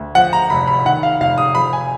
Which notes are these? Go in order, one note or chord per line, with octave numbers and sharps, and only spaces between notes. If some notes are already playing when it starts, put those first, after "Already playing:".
Already playing: D2
F3 F#5
A#5
F1 B5
B5
D#3 F#5
F5
F1 F5
D#6
F3 B5
G#5